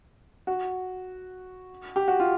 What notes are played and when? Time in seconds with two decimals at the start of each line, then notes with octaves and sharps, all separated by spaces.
0.47 F#4
1.96 G4
2.08 F#4
2.20 F4